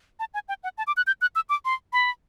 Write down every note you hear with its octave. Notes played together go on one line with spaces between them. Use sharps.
A5
G#5
G5
F#5
A5
D6
F#6
G6
F#6
E6
D6
C6
B5